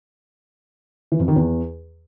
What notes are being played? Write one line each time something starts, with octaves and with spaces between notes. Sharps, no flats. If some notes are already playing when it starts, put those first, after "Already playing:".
E3
F2
D#3
E2